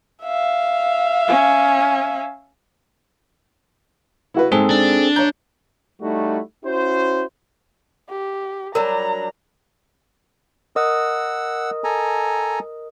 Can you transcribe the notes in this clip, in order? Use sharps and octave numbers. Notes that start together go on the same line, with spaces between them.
E5 F5
C#4
E4 F#4 B4
G#2 G#3 C4 G#4 A4
D4
C#5 A#5 G6
G3 A3 D#4 E4 F#4
C#4 E4 F#4 C5
G4
F#3 G3 D4 A#4 A#5
A#4 D#5 F#5 D#6 E6
A4 G#5 A#5